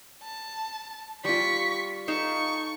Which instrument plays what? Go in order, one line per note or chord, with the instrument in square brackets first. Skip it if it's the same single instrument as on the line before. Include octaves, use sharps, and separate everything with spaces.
[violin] A5
[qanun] G3 F4 [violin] C#6 B6
[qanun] D#4 A4 F5 [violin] C#6